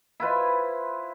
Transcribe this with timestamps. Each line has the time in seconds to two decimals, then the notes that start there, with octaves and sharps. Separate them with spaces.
0.20 E4 F4 B4 C5